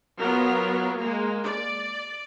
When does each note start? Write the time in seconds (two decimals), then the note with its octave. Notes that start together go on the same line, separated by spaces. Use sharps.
0.19 F#3 B3 F4 A#4
0.97 G#3 A#3
1.43 D5